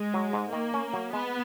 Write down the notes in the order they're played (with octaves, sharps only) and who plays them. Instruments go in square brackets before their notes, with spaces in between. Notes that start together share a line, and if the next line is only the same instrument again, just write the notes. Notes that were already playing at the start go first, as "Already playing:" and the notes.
Already playing: [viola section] G#3
[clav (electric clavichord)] F#3
G#2
[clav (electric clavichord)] D#3 [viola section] A#3
[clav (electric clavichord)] C#4
F#3
[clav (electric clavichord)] G#3 [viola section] B3